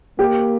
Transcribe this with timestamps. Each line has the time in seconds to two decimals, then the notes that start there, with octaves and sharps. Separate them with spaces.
0.19 A#3 G4